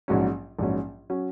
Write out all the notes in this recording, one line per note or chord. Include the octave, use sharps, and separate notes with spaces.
A#1 G#2 F#3 C#4
A#1 G#2 F#3 C#4
F#3 C#4